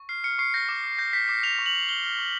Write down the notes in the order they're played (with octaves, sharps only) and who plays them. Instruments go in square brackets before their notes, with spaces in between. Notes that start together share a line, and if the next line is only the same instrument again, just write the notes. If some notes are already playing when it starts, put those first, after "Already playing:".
Already playing: [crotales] C#6
F6 C7
F6 C#7
C#6 C7
G6 A#6
D6
D6
G6 A#6
G6 B6
D6 C7
F6 F7
C#6
F#7
C#6
F6 G7
F6
C#6